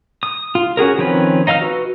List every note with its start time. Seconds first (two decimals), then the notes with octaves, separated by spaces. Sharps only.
0.23 D#6
0.55 F4
0.77 C#4 F#4 G#4 A#4
0.98 D#3 F3 C4 C#4 B4
1.47 D#4 D#5 F5 E6 F6
1.62 F#4 B4